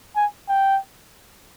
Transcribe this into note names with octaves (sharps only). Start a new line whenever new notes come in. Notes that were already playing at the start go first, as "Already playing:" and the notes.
G#5
G5